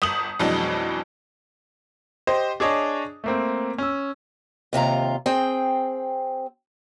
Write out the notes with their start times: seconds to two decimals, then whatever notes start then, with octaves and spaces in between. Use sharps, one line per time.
0.02 G1 D#6 F#7
0.39 F2 B2 E3 F#3 G#3 D4
2.27 G4 C5 D#5
2.60 D4 G#4 C#5 D#5 A5
3.24 A3 A#3 C4
3.78 C#4 E6
4.73 D#2 C3 F4 A#5
5.26 C4 G#4 G5